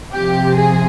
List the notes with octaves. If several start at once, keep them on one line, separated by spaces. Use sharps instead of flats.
C3 F3 G4
G#4